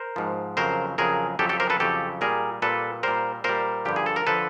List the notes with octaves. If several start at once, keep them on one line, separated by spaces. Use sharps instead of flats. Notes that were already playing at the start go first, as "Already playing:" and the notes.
Already playing: A#4 C5
G#2 F3
F2 C#3 F#3 A#4 C5
F2 C#3 F#3 G#4 A#4
F2 C#3 F#3 G4 A4
G4 A4
A#4 C5
A4 B4
F2 C#3 F#3 G4 A4
A#2 G3 G#4 A#4
A#2 G3 A4 B4
A#2 G3 A#4 C5
A#2 G3 A#4 C5
G2 D3 F3 G4
G#4
A4
A#4
D3 F3 A4 B4